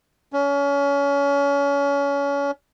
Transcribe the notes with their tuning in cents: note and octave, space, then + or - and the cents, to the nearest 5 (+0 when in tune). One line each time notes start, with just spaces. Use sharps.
C#4 +30